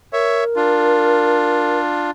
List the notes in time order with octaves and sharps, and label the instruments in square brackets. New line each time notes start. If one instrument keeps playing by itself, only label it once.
[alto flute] A#4 [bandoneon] C#5 E5
[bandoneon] D4 F4